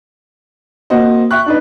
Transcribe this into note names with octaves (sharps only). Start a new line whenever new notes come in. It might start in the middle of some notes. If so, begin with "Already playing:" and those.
A#3 C4 F#4 C5 D#5
E5 G5 C#6 F#6
D4 D#4 B4